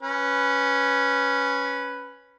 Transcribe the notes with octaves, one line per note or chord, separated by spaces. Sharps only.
C#4 B4